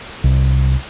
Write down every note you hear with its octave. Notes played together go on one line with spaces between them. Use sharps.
C2